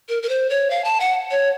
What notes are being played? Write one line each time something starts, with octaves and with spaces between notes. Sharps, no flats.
A#4
A#4
C5
C#5
F5
A5
F#5
C#5